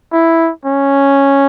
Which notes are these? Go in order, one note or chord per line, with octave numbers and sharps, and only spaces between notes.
E4
C#4